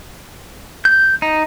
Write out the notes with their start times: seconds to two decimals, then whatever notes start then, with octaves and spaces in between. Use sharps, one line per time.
0.85 G6
1.22 D#4